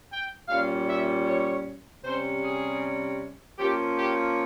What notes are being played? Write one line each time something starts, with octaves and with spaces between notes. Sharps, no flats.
G5
A#2 G3 C#4 F5
E5
C#5
C3 G3 C#4 C5
G#4
F3 A#3 C#4 G4
G4